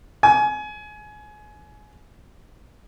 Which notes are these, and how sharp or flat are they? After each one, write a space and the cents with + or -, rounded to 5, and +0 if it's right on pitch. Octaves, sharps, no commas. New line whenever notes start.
G#5 +25